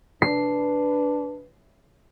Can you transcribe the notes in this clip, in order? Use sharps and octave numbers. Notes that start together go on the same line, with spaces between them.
D4 B4 C7